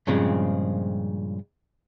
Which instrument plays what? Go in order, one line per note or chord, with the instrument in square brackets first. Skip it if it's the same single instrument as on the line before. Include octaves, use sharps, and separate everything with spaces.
[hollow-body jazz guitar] G2 A#2 C#3 F3 G#3 C4